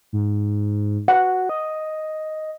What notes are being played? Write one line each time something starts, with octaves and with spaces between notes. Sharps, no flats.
G#2
F#4 F#5
D#5